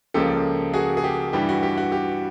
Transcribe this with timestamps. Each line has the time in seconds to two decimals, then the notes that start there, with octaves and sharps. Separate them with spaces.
0.14 C#2 C#3 F3 A#3 G4 A4
0.73 F#4 G#4
0.97 G#4
1.04 G4
1.33 G2 E3 G3 G4
1.49 F#4
1.63 G4
1.77 F#4
1.92 G4